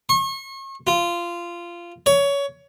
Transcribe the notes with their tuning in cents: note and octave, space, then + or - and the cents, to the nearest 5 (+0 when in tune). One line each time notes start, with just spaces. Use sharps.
C#6 -40
F4 -15
C#5 +20